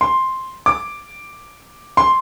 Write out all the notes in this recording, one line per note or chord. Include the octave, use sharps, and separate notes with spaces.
C6
D6
C6